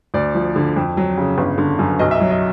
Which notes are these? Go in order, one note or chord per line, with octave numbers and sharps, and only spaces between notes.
D2 D5
F3
D3
F2
F#3
C#3
G1
D3
F#2
B1 D#5
E5
D#5
F#3
D#5